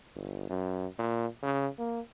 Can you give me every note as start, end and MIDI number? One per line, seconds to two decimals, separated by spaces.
0.15 0.48 31
0.50 0.87 42
0.99 1.27 46
1.43 1.68 49
1.79 2.00 58